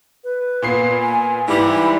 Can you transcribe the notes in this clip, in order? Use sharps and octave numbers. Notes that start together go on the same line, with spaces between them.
B4
A#2 B3 C7
G#5
G#2 E3 G3 E4